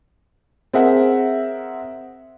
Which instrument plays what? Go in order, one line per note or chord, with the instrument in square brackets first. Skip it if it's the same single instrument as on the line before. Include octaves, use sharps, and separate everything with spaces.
[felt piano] C4 G#4 A#4 E5 F#5